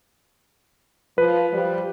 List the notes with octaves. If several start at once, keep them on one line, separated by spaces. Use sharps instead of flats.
F3 B4
F3 G3